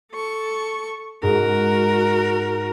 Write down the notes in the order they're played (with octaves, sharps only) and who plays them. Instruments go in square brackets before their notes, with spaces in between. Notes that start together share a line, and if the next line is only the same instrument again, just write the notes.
[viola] A4 C#6
[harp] G#2 [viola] F#4 A#4